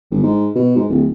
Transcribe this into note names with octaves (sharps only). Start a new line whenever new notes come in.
G1
G#2
B2
G#2
D1